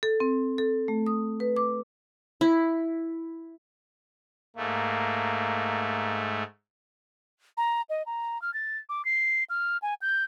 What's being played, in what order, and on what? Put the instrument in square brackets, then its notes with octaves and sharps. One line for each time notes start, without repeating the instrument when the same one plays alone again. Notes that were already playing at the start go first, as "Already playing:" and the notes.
[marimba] A4
C4
A4
A3
D#6
B4
D6
[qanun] E4
[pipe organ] G#2 A3 [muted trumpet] A#3
[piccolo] A#5
D#5
A#5
F6
A6
D6
C7
F6
G#5
G6